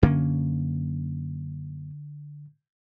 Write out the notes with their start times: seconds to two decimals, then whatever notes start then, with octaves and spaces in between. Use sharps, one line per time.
0.03 F#2 D3 A#3 C#4